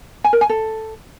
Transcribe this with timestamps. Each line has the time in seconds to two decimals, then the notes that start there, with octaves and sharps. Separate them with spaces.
0.24 G#5
0.33 A#4
0.41 G#5
0.49 A4